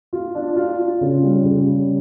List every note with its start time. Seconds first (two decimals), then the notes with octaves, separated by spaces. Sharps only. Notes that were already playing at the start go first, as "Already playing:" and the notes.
0.13 F4
0.35 D4
0.56 F4
0.79 F4
1.01 C#3
1.23 G3
1.44 C#3
1.67 G3